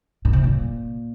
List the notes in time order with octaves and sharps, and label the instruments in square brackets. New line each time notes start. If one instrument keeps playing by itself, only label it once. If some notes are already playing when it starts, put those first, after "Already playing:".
[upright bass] A#2
C3
A#2